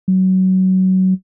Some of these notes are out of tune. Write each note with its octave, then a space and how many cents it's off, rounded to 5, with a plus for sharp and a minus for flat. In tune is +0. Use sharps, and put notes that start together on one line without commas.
F#3 +20